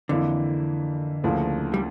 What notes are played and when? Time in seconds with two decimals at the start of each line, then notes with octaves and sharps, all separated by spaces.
0.09 F2 D3 E3 A#3 E4
1.24 D2 C#3 F3 A#3 E4
1.74 G3